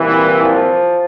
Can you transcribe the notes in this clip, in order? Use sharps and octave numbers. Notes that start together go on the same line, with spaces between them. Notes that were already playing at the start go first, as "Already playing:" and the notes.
Already playing: C2 A#2 E3
F3